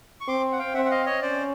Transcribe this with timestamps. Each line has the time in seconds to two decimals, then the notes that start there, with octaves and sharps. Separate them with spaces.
0.21 C#6
0.28 C4 C6 D6
0.52 F#5
0.59 F5 G5
0.74 C4 E5 F#5
0.85 F#5
0.91 D#5 F5
1.06 C#5 D#5
1.21 C#4 C5 D5